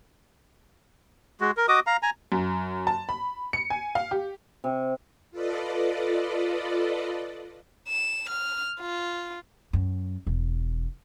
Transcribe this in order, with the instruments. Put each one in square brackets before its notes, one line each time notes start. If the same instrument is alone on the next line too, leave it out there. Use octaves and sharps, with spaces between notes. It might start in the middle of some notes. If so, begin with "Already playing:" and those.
[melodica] G#3 F#4
A#4
F#4 D#5 D6 D#6
F5 A#5
G#5 A#5
[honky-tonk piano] F#2
A5
B5
C#7
G#5
F5
G4
[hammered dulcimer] C3
[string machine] F4 A4 B4 D5 D#5
[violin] E7
F6
F4
[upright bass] F#2
E1